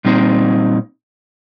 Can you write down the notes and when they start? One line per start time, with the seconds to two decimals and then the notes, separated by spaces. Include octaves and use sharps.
0.05 A#2 G3 C4 D#4